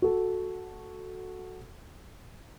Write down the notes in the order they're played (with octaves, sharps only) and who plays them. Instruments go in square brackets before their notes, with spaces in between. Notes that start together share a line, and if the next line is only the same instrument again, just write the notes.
[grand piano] F#4 A4